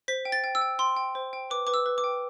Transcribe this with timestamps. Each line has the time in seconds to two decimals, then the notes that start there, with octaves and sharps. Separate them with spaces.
0.08 C5 B6
0.25 G5
0.32 A6
0.44 G5
0.55 E6
0.61 G5
0.79 G5 C6
0.96 G5
1.15 C5
1.33 G5
1.50 B4 D6
1.67 B4 D6
1.74 E6
1.86 B4
1.98 D6
2.04 G5